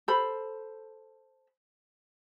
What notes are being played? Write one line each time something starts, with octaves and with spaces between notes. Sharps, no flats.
A4 C5 B5